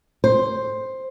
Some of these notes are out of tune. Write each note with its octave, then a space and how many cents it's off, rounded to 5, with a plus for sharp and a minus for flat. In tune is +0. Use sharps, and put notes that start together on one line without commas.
C5 +5